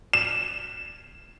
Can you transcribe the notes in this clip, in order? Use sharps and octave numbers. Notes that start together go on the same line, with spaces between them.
E7